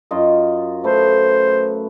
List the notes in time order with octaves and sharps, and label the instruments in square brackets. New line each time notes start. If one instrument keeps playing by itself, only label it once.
[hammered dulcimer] F#2 F4 D#5
[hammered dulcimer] A3 B4 [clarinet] C5